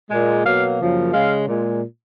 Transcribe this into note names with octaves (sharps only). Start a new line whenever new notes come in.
A#2 G#3
B2 F#3 A#3 F5
F#2 C#3 F3 A#3
C#3 G#3 F5
A#2 G#3